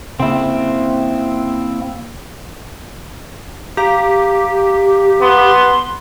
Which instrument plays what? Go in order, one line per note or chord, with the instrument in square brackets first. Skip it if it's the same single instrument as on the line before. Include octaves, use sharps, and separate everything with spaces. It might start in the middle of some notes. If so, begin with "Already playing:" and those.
[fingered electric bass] C#3 [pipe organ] A#3 [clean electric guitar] C4 E4
[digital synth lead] G4 [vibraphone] F5 A#5
[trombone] B3 [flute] C6